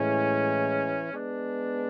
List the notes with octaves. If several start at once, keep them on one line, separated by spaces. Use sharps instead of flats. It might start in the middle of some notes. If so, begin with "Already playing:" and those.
Already playing: A2 E3 G#3 C#4
G#3 B3 D4